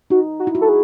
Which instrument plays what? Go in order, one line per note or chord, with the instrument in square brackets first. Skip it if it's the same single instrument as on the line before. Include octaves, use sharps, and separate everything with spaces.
[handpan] D#4 [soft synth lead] F#4
[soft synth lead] F#4
[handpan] E4
F#4
[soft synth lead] A4
G#4